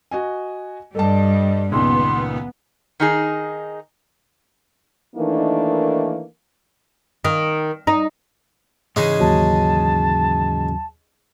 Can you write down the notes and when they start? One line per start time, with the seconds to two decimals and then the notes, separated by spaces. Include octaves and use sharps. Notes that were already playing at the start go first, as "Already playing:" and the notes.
0.11 F#4 D#5 G#5
0.95 G2 G3 A4 D#5 A5
1.72 C#2 A#2 D#3 B3 C6
3.00 D#3 D#4 G#4
5.16 D#3 E3 A3 A#3 D4 D#4
7.25 D#3
7.87 D#4
8.96 G#2 C#3 E3 G#3 C#4 D#4
9.20 D#2 F#3 A5